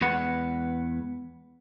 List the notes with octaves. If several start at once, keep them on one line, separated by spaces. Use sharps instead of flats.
E2 G#3 B4 F#5